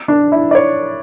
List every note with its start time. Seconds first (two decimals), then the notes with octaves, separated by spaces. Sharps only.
0.08 D4
0.32 E4
0.51 D5
0.55 C#5